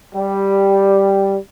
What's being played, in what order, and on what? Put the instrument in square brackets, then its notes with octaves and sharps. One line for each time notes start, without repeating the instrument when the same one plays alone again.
[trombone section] G3